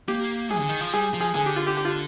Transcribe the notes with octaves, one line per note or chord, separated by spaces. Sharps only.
A#3 G4
G#4
D3
D#3
F3
G3 G#4
F3
G#4
D3 G#4
G4
F4
G4
G4
F4